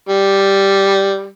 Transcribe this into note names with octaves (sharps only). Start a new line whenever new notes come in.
G3